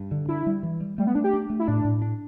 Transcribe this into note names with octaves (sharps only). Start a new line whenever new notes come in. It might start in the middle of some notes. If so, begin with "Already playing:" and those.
Already playing: G2
D3
D4 E4
G3
E3
G3
G3 A3
B3
A3 D4
G4
D4
A3
E4
A2 D4
A2
D4